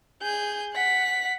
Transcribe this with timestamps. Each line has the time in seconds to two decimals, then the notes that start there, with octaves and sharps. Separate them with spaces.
0.22 G#4 G6
0.74 F#5 B6